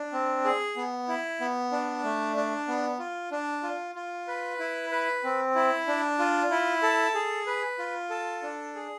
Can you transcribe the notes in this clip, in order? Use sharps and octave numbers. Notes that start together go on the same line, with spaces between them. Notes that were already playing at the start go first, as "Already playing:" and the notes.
Already playing: D4
C4
G#4
B3
E4
B3
D4
A3
D4
B3
F4
D4
F4
F4
B4
E4
B4
C4
E4
D4
F4
E4
A4
G#4
B4
F4
A4
D4
G#4